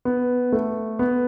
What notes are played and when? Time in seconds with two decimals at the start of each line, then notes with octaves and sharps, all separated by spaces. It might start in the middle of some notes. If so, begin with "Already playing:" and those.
0.05 B3
0.52 A3
0.99 B3